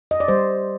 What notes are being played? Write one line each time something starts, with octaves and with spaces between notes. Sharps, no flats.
D#5
D5
G3 C5